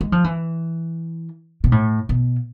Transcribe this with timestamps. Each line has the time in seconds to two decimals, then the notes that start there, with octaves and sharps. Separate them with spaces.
0.01 G#3
0.12 F3
0.24 E3
1.64 B2
1.72 A2
2.09 B2